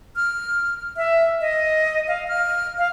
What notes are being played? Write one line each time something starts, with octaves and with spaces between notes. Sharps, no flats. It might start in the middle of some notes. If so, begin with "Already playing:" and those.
F6
E5
D#5
F5
F6
F5